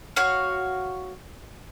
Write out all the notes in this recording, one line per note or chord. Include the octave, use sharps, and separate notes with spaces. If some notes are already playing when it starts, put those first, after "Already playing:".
F#4 C#5 F5